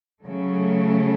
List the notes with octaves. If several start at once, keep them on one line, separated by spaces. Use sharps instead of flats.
C#3 F#3 A3